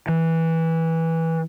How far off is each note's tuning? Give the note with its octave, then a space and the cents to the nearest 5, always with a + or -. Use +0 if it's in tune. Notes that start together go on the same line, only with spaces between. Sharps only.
E3 -15